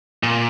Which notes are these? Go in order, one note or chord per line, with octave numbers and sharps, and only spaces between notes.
A#2